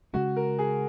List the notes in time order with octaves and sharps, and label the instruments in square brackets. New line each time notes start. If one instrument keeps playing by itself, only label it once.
[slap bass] C#3 G#3 C#4 [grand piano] F#4
[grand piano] A#4
G#4